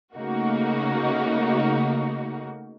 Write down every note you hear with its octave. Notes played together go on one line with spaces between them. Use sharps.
C#3 A3 A#3 D#4 F#4